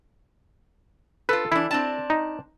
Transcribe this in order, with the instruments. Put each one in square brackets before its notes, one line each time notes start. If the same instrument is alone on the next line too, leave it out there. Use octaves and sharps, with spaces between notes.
[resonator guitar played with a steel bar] F4 A4 [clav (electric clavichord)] B4
[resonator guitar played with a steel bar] E3 D4 [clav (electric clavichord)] E4
[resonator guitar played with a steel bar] C4 D4 A5
[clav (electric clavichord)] D#4